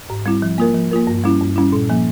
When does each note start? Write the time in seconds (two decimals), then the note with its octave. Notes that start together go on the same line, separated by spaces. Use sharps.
0.10 G#2
0.26 G3 C4 E4
0.42 F3
0.58 A#3 F4 A#4
0.74 F3
0.91 A#3 F4 A#4
1.07 G2
1.24 G3 C#4 E4
1.41 G2
1.56 G3 C#4 E4
1.73 A#2
1.90 F3 A#3